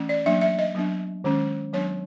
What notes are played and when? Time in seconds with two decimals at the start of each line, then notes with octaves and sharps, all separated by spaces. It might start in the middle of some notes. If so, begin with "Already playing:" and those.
Already playing: E3 A3 C#4
0.09 D5
0.26 F#3 A#3 D4 E5
0.41 E5
0.59 D#5
0.75 F#3 B3 D4
1.24 D#3 G#3 C#4
1.73 F#3 B3 D4 C#5